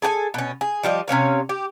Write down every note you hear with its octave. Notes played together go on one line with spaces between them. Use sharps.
G#4 A4 G5 G#5
B2 C#4
G#4
F3 G3 G4 D#5
C3 C#4 C#5 F5
G4